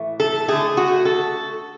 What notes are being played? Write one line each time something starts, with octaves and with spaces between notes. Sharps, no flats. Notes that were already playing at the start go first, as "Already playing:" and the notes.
Already playing: A2 E3 A3
A4
D3 A3 G#4
F#4
A4